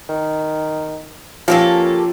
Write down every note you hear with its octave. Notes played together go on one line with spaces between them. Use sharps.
D#3
F3 A#3 C#4 G4 A4